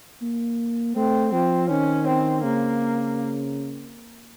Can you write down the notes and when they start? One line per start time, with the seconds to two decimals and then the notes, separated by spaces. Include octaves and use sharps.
0.22 A#3
0.96 A3 C4
1.32 F3 C4
1.70 D#3 C#4
2.07 C4
2.43 C#3 A#3